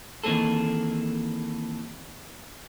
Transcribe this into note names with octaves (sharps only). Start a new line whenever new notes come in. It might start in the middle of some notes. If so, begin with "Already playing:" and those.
D#3 E3 A#3 C4 G#4 A4